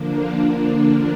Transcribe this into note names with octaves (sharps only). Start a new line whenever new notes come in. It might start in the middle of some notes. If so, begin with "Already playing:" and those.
Already playing: D3 F3 A#3 D4